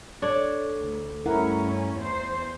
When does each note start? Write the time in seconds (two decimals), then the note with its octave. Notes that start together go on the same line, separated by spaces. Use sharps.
0.22 D4 A4 C#5
0.80 D2
1.26 G2 A3 C#4 E4 A#4 F#5
1.95 E2 C5